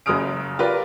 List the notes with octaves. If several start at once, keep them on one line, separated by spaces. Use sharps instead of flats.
F#1 F#2 G#4 D#6 F6 D7
F4 G4 A#4 B4 D5